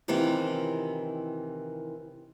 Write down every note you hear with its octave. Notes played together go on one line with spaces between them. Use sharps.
C3 D#3 E3 A#3 E4 F4